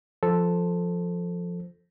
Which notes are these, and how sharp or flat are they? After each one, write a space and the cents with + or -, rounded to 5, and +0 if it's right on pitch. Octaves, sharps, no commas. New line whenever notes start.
F3 +0 A4 +0 C5 +0